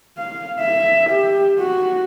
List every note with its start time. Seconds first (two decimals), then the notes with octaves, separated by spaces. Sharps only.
0.17 F5
0.60 E5
1.10 G4
1.59 F#4